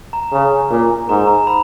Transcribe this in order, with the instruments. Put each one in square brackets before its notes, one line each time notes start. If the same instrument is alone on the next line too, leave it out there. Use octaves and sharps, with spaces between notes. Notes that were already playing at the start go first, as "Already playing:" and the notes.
[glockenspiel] A#5
[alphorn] C#3
A#2
[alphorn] G#2 [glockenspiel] A#5
[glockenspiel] A#5
B5